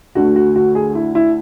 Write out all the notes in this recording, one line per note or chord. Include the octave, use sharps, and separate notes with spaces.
D2 D3 A3 F#4
F#4
F#4
G#4
E4
E4